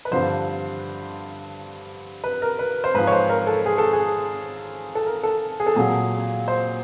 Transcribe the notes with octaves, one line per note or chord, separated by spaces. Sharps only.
B4
G2 D3 F3 C5
B4
A#4
B4
C5
G#2 F3 B4
C#5
C5
A#4
A4
G#4
A4
G#4
A4
A#4
A4
G#4
A4
A#2 F#3 G#4
C5